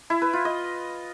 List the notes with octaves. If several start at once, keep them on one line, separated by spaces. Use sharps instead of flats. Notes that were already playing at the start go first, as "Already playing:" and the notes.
E4
B4
F4
D#5